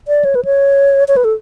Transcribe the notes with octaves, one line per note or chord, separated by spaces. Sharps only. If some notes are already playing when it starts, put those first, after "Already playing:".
D5
C#5
B4
C#5
C#5
B4
A4